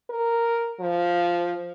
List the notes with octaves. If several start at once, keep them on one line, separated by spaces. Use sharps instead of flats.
A#4
F3